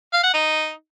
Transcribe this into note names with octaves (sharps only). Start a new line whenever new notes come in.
F5
F#5
D#4